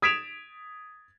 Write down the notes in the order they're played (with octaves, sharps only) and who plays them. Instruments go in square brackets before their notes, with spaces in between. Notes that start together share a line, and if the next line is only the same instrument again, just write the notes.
[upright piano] D#6 G#6 B6 D7 E7 F7